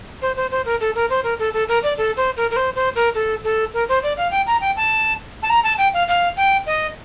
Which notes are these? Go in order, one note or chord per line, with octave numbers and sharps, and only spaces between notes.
C5
C5
C5
A#4
A4
A#4
C5
A#4
A4
A4
A#4
D5
A4
C5
A#4
A#4
C5
C5
A#4
A4
A4
A#4
C5
D5
F5
G5
A#5
G5
A5
A5
A#5
A5
G5
F5
F5
G5
D#5